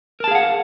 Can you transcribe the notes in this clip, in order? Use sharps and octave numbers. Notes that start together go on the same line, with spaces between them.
G#4 A#4 F5 F#5 A5